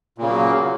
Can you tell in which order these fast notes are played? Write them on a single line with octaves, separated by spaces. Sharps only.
A#2 C#3 A#3 F#3